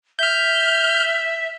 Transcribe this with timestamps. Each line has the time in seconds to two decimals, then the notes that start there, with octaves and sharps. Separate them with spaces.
0.19 E5 F6 G6